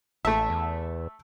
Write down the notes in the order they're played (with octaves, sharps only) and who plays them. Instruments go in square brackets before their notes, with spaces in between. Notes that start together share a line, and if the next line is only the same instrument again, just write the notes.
[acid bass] A1 [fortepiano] A3 E5 [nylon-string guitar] A5
[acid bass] E2